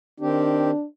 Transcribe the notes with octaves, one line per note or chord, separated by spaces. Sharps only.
D#3 C4 D4 G4